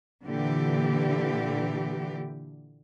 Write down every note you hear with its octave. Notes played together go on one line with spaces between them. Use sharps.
A#2 D3 E3 G4